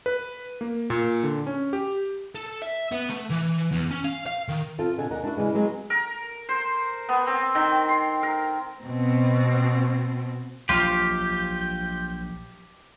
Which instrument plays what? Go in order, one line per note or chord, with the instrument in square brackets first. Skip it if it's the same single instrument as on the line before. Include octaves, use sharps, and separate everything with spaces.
[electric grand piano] B4
A#3
A#2
D3
C#4
G4
[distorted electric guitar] A4
E5
B3
A3
E3
E2
C#4
F5
F5
D#3
[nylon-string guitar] C4 F4 A4
B2 D3 G#5
D#2 D#4 A#4 F#5
D4 E4 F#4
C#3 E3 G#3
F#3 G#3 B3 C4
[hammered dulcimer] A#4
C5
B3
C4
D#3
C6
A#4
[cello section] B2 C4
[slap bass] A#1 F3 F#3 [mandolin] F4 [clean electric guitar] G4 [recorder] G6